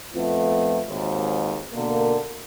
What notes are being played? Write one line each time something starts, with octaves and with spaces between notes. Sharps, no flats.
F2 A3 B3 F4
G#1 D#2 G#2
B2 D3 A#3